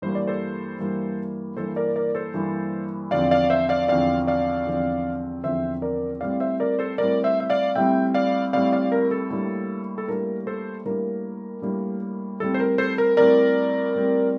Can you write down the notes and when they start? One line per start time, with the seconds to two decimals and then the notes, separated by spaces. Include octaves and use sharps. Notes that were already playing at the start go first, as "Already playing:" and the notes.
0.02 G2 E3 G3 A#3 C5
0.15 D5
0.27 A4 C5
0.79 G2 E3 G3 A#3
1.56 G2 E3 G3 A#3 A4 C5
1.76 A#4 D5
1.96 A#4 D5
2.15 A4 C5
2.34 G2 E3 G3 A#3
3.11 E2 D3 F3 C4 D5 F5
3.31 D5 F5
3.50 C5 E5
3.69 D5 F5
3.88 E2 D3 F3 C4 D5 F5
4.27 D5 F5
4.67 E2 D3 F3 C4
5.44 E2 D3 F3 C4 C5 E5
5.82 A#4 D5
6.21 A2 G3 C4 D5 F5
6.40 C5 E5
6.60 A#4 D5
6.79 A4 C5
6.98 A2 G3 C4 A#4 D5
7.24 C5 E5
7.40 E5
7.50 D5 F5
7.75 A2 G3 C4 E5 G5
8.14 D5 F5
8.53 A2 G3 C4 D5 F5
8.72 D5 F5
8.92 A#4
9.11 A4
9.30 A2 G3 A#3 D4
9.98 A4
10.08 A2 G3 A#3 D4 A#4
10.47 A4 C5
10.85 A2 G3 A#3 D4 A#4
11.62 A2 G3 A#3 D4
12.40 A2 G3 C4 A4
12.54 C5
12.60 A#4
12.78 A4 C5
12.98 A#4
13.17 A2 G3 C4 A#4 D5
13.95 A2 G3 C4